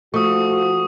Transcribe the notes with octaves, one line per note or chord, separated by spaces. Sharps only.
F3 A3 F#4 C#6 D#6